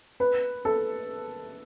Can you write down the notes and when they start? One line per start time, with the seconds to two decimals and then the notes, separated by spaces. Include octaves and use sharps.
0.20 B4
0.65 A4